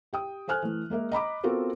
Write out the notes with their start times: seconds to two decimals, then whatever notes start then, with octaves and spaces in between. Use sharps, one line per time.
0.13 G4 G5 D#6
0.48 A4 C5 G#5 F6 F#6
0.63 E3 A3
0.90 G#3 A#3 A#4 E5
1.12 D#5 A#5 B5 D6
1.44 B3 C4 F4 F#4 A4 A#4